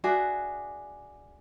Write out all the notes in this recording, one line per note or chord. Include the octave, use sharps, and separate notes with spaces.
D4 F#4 G#4 E5